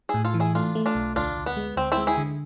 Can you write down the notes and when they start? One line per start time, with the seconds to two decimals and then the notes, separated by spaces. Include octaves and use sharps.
0.09 A2 E4 G#4
0.25 F4 A4
0.34 E3
0.40 E4 G#4
0.55 A3 D4 F4
0.75 A3
0.86 D4 F4
0.95 B1
1.16 D2 D4 F4
1.37 D2
1.46 B3
1.57 G#3
1.77 D2 C4
1.92 C4 E4
1.97 G#3
2.07 E4 G#4
2.17 D3